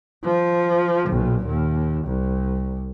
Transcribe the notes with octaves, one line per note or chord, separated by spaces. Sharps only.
F3
B1 A#2
D#2
C2